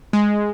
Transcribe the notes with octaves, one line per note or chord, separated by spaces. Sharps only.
G#3